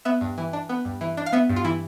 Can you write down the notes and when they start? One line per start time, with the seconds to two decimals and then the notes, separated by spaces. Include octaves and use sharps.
0.05 B3 E5
0.21 G2
0.38 E3
0.53 D4
0.69 B3
0.85 G2
1.01 E3
1.17 D4
1.26 F5
1.33 B3 E5
1.49 G2
1.56 F4
1.65 E3 E4